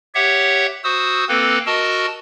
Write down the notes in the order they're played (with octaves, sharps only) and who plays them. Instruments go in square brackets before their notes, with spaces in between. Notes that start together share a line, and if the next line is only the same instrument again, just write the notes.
[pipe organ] G4 C#5 E5 F#5
F#4 C5 D#6 E6
A#3 C4 A4 B4
F#4 A#4 D#5 A5 E6